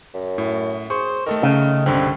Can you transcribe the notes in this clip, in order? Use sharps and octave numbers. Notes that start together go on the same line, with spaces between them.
F#2
A2
G#4 C5 C#6
D#3 A3 A4 A#4
C#3
C2 G2 D3 C4